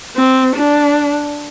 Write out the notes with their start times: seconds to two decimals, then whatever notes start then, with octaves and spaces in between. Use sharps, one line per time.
0.16 C4
0.56 D4